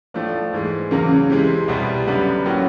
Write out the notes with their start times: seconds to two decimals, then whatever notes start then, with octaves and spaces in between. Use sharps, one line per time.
0.14 A2 F3 A3 D4 F4
0.53 G#2 E3 G#3
0.91 E2 C#3 F#3 A#3
1.30 C3 E3 G#3 C4
1.68 C2 B2 G3 B3
2.07 F#2 D3 G3 B3
2.45 A2 F#3 A#3 C#4 F#4